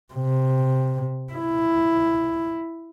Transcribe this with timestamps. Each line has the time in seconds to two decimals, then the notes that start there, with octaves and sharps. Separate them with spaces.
0.14 C3
1.33 E4